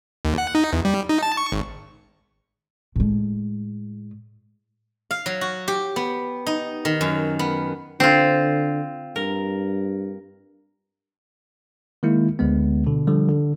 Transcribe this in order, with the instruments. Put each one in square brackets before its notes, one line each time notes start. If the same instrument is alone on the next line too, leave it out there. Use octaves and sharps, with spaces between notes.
[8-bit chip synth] D#2
F#5
D#4
E2
G3
D#4
A5
C#6
G#1
[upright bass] A2 G#3
[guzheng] F5
F#3
F#4
G4
B3
D#4
D#3
F#2
B3
[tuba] D3 [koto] C4 F4
[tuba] G2 [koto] A#4
[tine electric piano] D#3 G#3 A#3 E4
D2 D3 G#3 B3
B2 D3
D3 F3 G3
D3